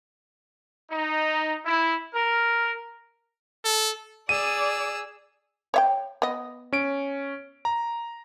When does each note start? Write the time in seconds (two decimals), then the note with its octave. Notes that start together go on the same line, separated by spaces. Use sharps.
0.90 D#4
1.64 E4
2.12 A#4
3.65 A4
4.29 G#4 D5 E6 D#7
5.74 C#5 E5 G5
6.22 B3 D#5
6.73 C#4 D7
7.65 A#5